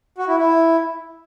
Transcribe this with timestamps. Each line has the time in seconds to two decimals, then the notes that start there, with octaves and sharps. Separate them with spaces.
0.18 F#4
0.28 E4
0.38 E4